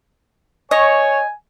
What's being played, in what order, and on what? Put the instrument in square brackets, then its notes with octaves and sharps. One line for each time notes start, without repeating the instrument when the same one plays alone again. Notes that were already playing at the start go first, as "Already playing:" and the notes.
[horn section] C#5 [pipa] D#5 [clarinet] G#5